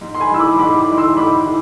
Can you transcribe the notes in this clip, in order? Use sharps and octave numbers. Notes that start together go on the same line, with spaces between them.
G#2
C6
G#5 B5
E3 G#3 E6
B5 D6
G#2 B5 D6
B5 D6
E3 G#3
C6 E6
G#2 B5 D6
E3